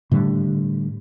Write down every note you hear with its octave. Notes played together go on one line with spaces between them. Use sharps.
A2 D3 G3